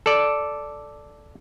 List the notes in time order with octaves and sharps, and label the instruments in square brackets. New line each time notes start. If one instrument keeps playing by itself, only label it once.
[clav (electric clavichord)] A4 D5